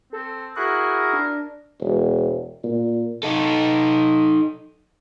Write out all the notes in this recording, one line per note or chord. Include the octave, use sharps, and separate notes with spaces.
C4 A4
E4 F#4 G#4 A#4 F#6
D4
E1
A#2
D#4 A4